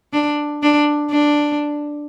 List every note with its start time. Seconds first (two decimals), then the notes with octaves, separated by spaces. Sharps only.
0.13 D4
0.63 D4
1.11 D4